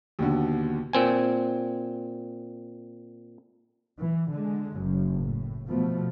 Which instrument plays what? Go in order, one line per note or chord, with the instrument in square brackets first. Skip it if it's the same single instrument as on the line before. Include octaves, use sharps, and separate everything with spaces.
[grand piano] D#2 B2 D3
[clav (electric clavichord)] A#2 C4 G#5
[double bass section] E3
D3 G#3
F#1 F#2
A2
B2 F3 A3 B3